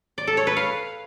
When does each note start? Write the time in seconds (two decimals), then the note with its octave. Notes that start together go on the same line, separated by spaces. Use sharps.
0.18 D5
0.27 A4
0.37 C#5
0.47 B4
0.57 F5